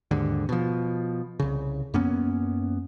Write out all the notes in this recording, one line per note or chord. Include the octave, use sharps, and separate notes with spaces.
D#2 G#2 D3
B2 F3
C2 C#3
F#2 A#3 B3 C#4